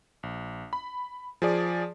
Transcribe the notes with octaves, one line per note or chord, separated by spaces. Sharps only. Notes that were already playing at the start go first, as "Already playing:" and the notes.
A#1
B5
F3 G#4 D5